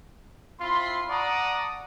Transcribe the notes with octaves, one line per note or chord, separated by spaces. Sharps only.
C4 E4 F4 B5 C6
D5 F#5 A5 A#5 C#6 D#6